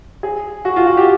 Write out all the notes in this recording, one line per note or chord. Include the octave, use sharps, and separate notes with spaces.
G#4
F#4
F4
F#4
G4